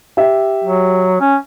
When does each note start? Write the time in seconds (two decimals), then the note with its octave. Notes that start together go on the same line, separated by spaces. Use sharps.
0.17 G4 E5
0.64 F#3
1.20 C#4